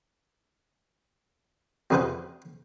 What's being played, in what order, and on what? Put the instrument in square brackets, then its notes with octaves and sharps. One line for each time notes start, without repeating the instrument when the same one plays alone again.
[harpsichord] F2 C#3 G#4 B4 C5 F#5